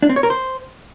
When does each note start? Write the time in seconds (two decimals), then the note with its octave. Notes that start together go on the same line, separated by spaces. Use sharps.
0.02 D4
0.09 C4
0.16 C#5
0.23 A#4
0.30 C5